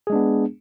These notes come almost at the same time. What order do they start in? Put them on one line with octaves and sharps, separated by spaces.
G#4 G#3 D4 B3